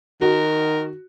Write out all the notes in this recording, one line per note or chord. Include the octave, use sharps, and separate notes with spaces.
D#3 F#4 A#4